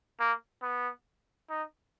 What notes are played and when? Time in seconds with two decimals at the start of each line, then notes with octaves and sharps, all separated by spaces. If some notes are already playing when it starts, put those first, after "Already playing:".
0.20 A#3
0.62 B3
1.50 D#4